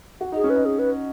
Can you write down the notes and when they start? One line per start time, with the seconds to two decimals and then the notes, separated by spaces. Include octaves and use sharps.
0.21 F#4
0.32 D#4 G#4
0.44 C#4
0.49 B4
0.55 D#4
0.65 G#4
0.79 B4